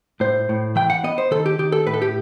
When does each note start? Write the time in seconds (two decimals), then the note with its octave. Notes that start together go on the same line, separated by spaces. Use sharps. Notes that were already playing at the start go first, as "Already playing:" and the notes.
0.20 A2 C5
0.49 A2
0.76 E3 G5
0.90 F#5
1.04 B3 D#5
1.18 C5
1.31 D#3 A4
1.46 G4
1.59 D#3 G4
1.72 A4
1.86 A2 B4
1.94 A4
2.02 G4